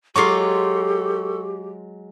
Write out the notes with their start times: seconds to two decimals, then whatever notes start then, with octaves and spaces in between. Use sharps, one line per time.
0.16 F#3 G#3 F4 G4 A4 C#6 D6 C7